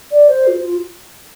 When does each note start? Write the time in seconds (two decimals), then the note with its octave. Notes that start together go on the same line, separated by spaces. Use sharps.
0.11 D5
0.28 C5
0.47 F4
0.61 F4